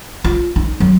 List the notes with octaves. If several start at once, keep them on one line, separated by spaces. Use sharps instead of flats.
F4
D#4
F#3